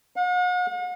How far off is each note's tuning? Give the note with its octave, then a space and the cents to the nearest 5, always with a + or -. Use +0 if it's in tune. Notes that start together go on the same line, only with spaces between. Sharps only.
F#5 -45